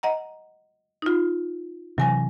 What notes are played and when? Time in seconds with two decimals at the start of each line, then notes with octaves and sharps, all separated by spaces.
0.03 D#5 F#5 A#5
1.02 D#4 F4
1.98 C3 E3 F#3 G#5 A#6